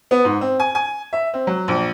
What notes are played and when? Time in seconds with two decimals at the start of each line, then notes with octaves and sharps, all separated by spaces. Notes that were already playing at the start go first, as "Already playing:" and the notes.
0.11 B3
0.25 G#2
0.41 C4
0.60 G#5
0.75 G#5
1.13 E5
1.34 C4
1.47 F#3
1.68 A#1